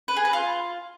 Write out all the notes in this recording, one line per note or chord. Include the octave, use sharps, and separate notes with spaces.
B4
G#4
B4
F4